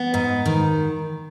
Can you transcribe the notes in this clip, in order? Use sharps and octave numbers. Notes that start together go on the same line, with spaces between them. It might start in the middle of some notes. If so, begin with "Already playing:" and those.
Already playing: B3
G#2
D#3